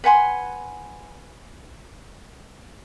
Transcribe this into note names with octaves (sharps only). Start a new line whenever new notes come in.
B4 F#5 G#5 C6